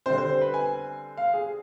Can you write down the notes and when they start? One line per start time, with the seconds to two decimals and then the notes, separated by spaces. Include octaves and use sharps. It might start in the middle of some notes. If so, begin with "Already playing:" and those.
0.06 D3 G3 C4 C5
0.18 C5
0.41 B4
0.54 G#5
1.17 F5
1.33 G#4